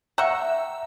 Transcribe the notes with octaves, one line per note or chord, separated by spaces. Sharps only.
E5 F#5 G5 A#5 C#6 E6